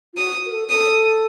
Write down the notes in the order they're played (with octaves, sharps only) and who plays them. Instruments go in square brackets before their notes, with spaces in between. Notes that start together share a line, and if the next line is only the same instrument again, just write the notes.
[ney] F4
[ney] F#4 [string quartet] D#6
[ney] A#4
A4
[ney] A4 [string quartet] D#6